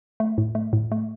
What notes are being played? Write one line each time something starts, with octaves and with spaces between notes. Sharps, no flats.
A3
A2
A3
A2
A3